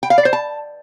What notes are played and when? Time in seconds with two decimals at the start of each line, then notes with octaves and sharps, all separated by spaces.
0.03 G5
0.10 F5
0.18 D5
0.25 C5
0.33 A5